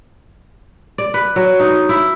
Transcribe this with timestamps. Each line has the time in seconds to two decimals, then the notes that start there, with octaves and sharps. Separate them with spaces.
0.98 D5
1.14 B4
1.36 F#3
1.60 D#4
1.89 E4